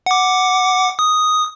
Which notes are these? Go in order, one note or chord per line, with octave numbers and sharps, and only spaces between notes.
F#5 D6
D#6